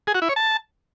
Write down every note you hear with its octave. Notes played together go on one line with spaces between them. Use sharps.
G#4
F#4
E4
C#5
A5